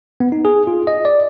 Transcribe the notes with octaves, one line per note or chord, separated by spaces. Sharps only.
B3
D#4
G#4
F4
D#5
D5